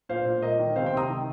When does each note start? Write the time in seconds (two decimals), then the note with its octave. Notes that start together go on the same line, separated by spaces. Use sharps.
0.09 A#2 C5 F5
0.26 A#2
0.42 A#3 D#5
0.59 D#3
0.76 C3 C5 F5
0.86 G5 C6
0.93 C3 A#5 D#6
1.09 D#3